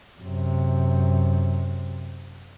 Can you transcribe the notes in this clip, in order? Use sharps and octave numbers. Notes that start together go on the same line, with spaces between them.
F#2 C3